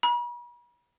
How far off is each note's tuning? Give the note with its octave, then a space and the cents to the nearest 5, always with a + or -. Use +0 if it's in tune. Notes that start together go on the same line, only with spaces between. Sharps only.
B5 -45